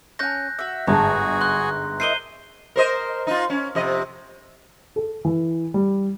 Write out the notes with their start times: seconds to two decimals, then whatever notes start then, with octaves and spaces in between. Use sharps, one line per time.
0.19 C#4 G#5 F#6 G6 A#6
0.59 F#4 E5
0.87 G1 G#2 F#4 G#4 A5 A#5
1.41 C6 F#6
2.00 E4 A#4 C5 D#5 C7 D#7 G7
2.76 A#4 C5 D#5
3.27 D#4 F4
3.50 C#4
3.75 F2 C3 D#5
4.96 A4
5.25 E3
5.74 G3